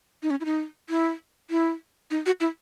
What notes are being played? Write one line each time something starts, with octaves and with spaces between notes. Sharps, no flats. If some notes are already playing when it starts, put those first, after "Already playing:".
D#4
C#4
E4
D#4
E4
E4
D#4
F#4
E4